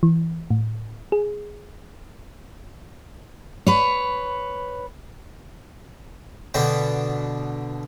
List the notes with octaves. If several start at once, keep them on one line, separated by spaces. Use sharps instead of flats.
E3
A2
G#4
B4 C#5
B2 D3 B3 D4 G5